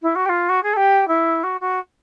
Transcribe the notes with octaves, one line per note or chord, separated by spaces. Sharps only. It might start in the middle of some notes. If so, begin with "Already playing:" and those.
E4
F#4
G4
F4
F#4
G#4
A4
G4
E4
F#4
F#4